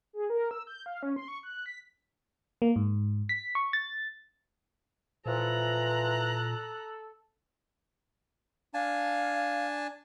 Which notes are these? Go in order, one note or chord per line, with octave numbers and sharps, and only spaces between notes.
G#4
A#4
E6
G6
F5
C#4
C6
C#6
F#6
B6
A#3
G#2
B6
C#6
A6
A#2 E3 F3 A4 A#5 F#6
D4 F5 G#5 A5